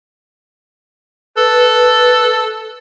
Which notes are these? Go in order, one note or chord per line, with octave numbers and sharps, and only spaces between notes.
A4 B4